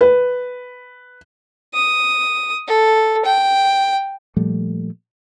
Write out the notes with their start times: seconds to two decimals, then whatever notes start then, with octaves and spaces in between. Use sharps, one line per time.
0.01 B4
1.74 D#6
2.67 A4
3.25 G5
4.37 A#2 F3 G3 A3